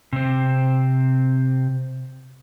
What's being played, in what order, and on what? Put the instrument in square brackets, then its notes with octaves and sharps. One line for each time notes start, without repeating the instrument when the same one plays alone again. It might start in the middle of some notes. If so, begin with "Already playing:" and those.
[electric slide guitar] C3 C4